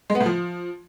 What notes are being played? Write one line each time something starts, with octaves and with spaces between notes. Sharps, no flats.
G#3
B3
A2
F3